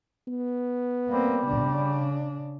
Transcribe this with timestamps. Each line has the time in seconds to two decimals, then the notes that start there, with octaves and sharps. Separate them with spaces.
0.28 B3
1.09 G3 A#3 C4
1.47 C#3 D4